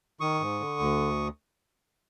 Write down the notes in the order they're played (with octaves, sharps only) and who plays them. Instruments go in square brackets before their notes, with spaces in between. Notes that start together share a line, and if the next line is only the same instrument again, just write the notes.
[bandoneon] D#3 C#6 D#6
G#2
D3
D2